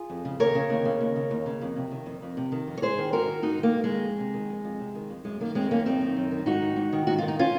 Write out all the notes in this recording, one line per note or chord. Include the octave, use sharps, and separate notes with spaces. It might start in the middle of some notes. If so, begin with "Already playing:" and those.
Already playing: F4 G#4
F2
C#3
D#2 A#4 C#5
C#3
D#2
C#3
D#2
C#3
D#2
C#3
F2
C3
D#3
F2
F2
C3
D#3
F2
C#5
G#2 G#4 C5
D#3
G#2 F#4 A#4
D#3
G#2 D#4 F#4
D#3 A#3
G#2
D#3 G#3
F2
C3
D#3
F2
F2
C3
D#3
F2
F#2 G#3
D#3 A#3
F#2 G#3 C4
D#3 A#3 C#4
F#2 C4 D#4
D#3
F#2
D#3
G#2 D#4 F#4
D#3
G#2
D#3
G#2 F#4
D#3 F4
D#4
C#4 F4